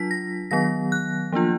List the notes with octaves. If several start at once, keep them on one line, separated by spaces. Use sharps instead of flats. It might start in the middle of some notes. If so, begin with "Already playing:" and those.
Already playing: F#3 D4 F4 B6
A#6
D#3 F#3 B3 A#6
F#6
F3 A#3 D4 F4